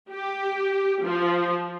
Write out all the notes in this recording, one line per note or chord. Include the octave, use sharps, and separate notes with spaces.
G4
F3